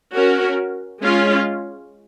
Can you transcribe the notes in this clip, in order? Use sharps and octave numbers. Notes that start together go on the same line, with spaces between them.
C#4 F#4 A#4
G#3 C#4 F4